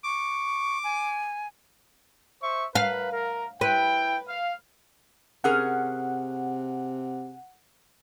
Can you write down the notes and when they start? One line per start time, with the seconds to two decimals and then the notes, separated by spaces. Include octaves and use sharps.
0.04 C#6 D6
0.84 G#5
2.42 C5 E5 C#6
2.75 A#4 B4 F5
3.12 A#4
3.61 E4 B4 G5
4.27 F5
5.44 C3 C#4 G#4 A#4 F#5